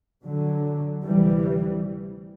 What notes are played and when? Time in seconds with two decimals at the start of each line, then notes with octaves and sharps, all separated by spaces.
0.23 D3 F#3
1.04 D2 C3 E3 G3